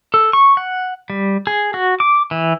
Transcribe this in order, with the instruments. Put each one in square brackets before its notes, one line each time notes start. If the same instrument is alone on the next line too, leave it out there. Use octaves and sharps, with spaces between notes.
[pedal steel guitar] A4
C#6
F#5
G3
G#4
F#4
D6
E3